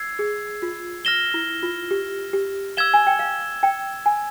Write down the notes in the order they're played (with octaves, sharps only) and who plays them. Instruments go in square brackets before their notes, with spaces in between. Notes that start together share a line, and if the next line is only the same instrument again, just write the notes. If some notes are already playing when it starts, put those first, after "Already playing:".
Already playing: [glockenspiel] E6 G#6 C7
[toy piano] G#4
F4
[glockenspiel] F6 A#6 E7 G7
[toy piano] E4
F4
G4
G4
[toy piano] F5 [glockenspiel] E6 G#6 E7 G7
[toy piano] G#5
G5
F5
G5
G#5